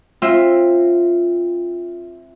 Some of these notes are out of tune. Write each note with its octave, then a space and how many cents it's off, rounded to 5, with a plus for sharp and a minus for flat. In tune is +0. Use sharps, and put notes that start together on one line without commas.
C4 +30 F4 +0 E5 +0